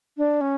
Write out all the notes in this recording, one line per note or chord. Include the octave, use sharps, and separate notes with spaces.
D4
C#4